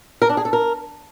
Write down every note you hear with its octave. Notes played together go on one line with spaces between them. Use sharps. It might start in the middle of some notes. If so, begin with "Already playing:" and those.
A#4
D4
G#4
A4
A#4